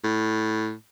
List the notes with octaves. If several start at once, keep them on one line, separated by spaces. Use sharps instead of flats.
A2